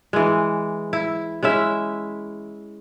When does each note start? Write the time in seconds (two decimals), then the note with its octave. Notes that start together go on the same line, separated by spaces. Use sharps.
0.13 E3 G#3
0.93 E4
1.43 G#3 C#4 E4 E5